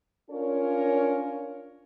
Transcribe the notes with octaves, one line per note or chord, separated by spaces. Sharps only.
C#4 D4 F4 A#4 C#5